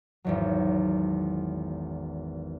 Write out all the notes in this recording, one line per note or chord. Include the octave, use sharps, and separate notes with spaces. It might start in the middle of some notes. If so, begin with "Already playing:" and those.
G#1 E2 F#3